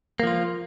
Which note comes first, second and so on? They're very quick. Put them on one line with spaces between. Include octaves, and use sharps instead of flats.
A#3 F3 F4